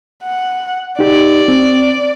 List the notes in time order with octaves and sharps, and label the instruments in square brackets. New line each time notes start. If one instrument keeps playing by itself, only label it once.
[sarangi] F#5
[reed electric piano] D#4 G4 [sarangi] D5
[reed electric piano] C4